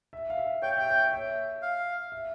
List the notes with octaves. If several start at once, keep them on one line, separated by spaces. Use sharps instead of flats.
E5
F5
E5
C#5 G5
E5 G5
C#5
E5
F5
E5